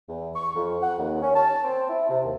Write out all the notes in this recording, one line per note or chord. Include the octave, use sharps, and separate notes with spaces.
E2
C#6
F2
F#5
D#2
C#4
A5
C4
E4
C3
D#2